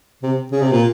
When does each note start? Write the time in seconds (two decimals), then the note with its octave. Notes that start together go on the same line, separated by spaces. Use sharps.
0.23 C3
0.52 C#3
0.62 C3
0.72 A#2